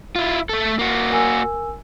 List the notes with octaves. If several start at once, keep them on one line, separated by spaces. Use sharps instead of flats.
E4 F4
A3 A4
A#3 F#4
A#4 G#5 E6